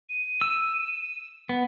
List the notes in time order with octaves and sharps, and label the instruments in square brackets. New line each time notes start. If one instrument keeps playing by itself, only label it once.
[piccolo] D#7
[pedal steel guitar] E6
B3